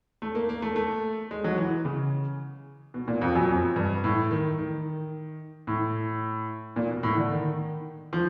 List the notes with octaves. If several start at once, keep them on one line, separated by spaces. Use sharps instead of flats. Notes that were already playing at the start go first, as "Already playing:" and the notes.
A3
A#3
A#3
A3
A3
G#3
F#3
E3
C#3
B2
A#2
F2
F#2
F2
G2
A2
D#3
D#3
A2
A#2
B2
A2
D3
D#3
F3